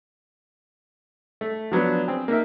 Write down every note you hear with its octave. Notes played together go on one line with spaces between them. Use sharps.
A3
F3 F#3 B3 D4
C4 G#4
A#3 D#4 A#4 E5